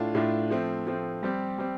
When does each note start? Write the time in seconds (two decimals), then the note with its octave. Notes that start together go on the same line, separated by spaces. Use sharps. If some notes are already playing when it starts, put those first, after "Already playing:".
Already playing: A2 A3 D4 F4
0.15 A2 A3 D4 F4
0.50 F3 A3 C4
0.87 F3 A3 C4
1.23 G3 C4 G4
1.58 G3 C4 G4